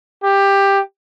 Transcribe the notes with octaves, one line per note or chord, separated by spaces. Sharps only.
G4